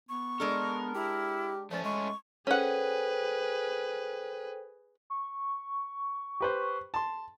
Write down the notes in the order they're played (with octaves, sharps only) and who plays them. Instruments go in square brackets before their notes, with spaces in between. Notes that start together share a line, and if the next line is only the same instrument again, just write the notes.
[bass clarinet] B3 [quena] C#6
[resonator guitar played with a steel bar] G#3 D4 A4 [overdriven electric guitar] A#4
[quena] E4 [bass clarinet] G4
[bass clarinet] F3 [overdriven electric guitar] A3 C#4 [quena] D5
[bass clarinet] G#3 [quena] C#6
[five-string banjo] C#4 F#5 [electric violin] G#4 B4 [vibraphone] A4 C5 G5
[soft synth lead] C#6
[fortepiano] G4 B4 C5
A5 C6